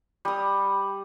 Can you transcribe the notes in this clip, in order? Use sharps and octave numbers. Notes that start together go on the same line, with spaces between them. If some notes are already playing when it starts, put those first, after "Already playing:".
G3 B5 D#6